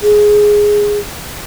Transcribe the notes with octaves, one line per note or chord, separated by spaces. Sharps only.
G#4